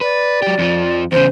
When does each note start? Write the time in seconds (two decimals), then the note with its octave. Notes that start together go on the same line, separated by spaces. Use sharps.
0.01 B4 D5
0.42 F#3 G4
0.59 F2 F3
1.12 E2 C#3 C5